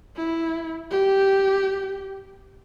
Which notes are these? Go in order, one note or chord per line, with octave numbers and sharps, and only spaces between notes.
E4
G4